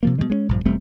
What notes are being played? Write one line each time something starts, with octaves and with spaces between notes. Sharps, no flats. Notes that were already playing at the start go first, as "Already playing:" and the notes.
C3 F3 A#3
B2 D#3 G3 G#3
G#3 C4 C#4
A#1 G2 F3
E1 G3 A3 C4